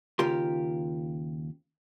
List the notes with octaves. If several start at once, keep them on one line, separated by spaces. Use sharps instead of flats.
D#2 C#3 F4 G4 A#4 C6